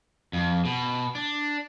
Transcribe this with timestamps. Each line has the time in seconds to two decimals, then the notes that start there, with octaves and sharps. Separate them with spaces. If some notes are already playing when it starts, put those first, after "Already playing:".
0.33 F2
0.65 B2
1.15 D4